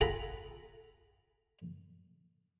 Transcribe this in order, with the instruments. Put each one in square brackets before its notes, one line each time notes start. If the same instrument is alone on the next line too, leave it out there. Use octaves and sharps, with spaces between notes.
[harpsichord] F4 G#4 A4 F#5 A#5 B5